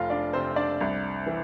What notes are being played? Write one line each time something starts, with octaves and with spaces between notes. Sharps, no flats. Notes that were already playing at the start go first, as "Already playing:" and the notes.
Already playing: F1 F4 F5
D4 D5
C3 C4 C5
D4 D5
C2
E3